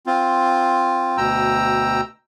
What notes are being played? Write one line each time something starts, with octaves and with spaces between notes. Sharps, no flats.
C4 F4
D2 B2 G5 A#5 E6